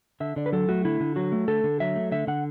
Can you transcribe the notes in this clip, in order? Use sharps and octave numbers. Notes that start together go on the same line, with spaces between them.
D3 E5
D3 D5
B4
F#3 A4
A3 F#4
D3 E4
D3
F#3 F#4
A3
D3 A4
D3
F#3 E5
A3
D3 E5
D3 F#5